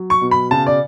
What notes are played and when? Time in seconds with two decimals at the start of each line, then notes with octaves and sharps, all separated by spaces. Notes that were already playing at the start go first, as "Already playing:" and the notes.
Already playing: F#3
0.10 C#6
0.21 B2
0.31 B5
0.51 C#3 A5
0.67 D5